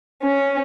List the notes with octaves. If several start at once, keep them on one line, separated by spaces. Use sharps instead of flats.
C#4